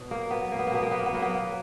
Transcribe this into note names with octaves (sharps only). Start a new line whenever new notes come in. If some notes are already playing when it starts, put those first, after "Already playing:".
Already playing: B2 F#3
A#3
F#3 B3
A#3
B3
A#3
B2 B3
A#3
B3
A#3
B3
F#3 A#3
B3
A#3